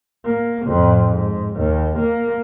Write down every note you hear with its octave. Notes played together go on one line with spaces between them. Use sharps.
A#3
F2 A2
G#2
D#2
A#3